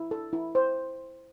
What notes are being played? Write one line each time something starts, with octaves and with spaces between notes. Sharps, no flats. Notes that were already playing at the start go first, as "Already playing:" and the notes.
Already playing: E4
A4
E4
C5